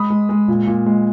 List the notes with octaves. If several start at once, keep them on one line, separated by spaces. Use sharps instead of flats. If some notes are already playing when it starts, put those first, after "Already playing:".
Already playing: G#3 B5 D#6
G#3
G#3
A#2
A#2
G#3